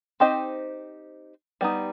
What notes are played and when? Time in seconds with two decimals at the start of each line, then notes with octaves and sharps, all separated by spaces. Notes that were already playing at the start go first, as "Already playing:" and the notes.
0.20 C4 D#4 G4 C5 D#5
1.61 G3 B3 D#4